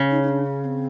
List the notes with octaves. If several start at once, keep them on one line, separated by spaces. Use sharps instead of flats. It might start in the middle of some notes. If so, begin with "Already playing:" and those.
Already playing: C#3
D#4
D#4
D4
C#4
C4